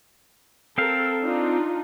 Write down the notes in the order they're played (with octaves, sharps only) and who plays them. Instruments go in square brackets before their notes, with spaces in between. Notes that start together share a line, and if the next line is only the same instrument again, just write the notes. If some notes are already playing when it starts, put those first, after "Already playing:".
[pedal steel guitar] C4 F5 [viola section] A4 A#4
[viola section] D4 D#4 F4